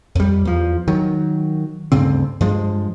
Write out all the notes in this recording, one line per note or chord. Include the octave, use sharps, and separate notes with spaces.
F2 G3
E2 F3
D#3 F#3
D2 G2 C#3 C4
G2 F3 G#3